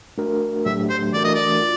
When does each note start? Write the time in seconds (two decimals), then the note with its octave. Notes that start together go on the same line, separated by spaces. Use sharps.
0.18 A3 D4 F#4 A#4
0.65 A2 F#3 A3 D4 G4 E5
0.90 C5
1.13 E3 A3 D4 F#4 A#4 D5
1.24 D#5
1.35 D5
1.61 F4